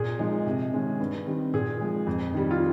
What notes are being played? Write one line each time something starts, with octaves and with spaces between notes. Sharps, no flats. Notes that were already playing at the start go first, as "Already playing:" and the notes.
Already playing: A#2 G#4
F3 G#3 D#4
C3
D#3 G#3 C#4
G2
D#3 G3 C4
A#2 G#4
F3 G#3
F2
D#3 G3
F4